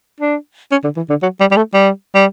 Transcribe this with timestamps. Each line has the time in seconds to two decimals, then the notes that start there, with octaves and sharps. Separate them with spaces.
0.20 D4
0.72 C#4
0.84 D3
0.97 E3
1.10 D3
1.23 F#3
1.40 G3
1.51 G3
1.57 A3
1.74 G3
2.15 G3